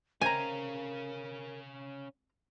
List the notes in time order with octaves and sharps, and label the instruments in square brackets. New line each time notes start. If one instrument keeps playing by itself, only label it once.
[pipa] C4 A#5 [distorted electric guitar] C#4 F5 [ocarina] A#4 [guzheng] G#5